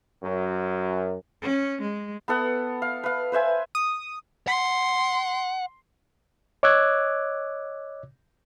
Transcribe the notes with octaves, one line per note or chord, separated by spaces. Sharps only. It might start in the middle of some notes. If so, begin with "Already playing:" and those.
F#2
C#4
G#3
B3 A4 F#5
F5
B4 F5
B4 C5 E5 G#5
D#6
F#5 C6
C#5 D#5 D6 E6 F#6 G#6